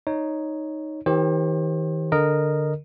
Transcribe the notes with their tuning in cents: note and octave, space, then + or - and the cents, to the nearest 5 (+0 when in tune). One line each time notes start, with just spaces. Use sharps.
D#4 +0 C#5 +0
D#3 +45 G4 +0 C5 +40
D3 +0 A#4 +0 D#5 -15